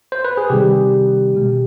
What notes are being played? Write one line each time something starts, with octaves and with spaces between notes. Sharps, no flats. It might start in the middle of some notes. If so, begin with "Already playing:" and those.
C5
B4
G#4
C3 D#3 G3 G4
B2 G#3